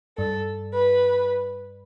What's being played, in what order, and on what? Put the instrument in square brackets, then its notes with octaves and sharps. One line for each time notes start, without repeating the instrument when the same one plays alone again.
[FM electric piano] G2 [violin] A4
[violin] B4